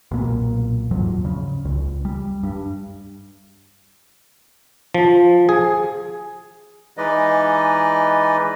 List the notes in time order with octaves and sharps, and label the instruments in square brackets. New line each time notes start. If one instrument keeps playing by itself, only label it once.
[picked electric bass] B1 A#2 A#3
D#2 G#2 F3 F#3
C#3
C#2
G3
G2
[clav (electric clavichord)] F3
G#4
[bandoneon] E3 G#3 D#4 B4 D5 D#5